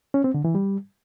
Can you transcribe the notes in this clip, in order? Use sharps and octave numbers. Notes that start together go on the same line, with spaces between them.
C#4
C4
D3
E3
G3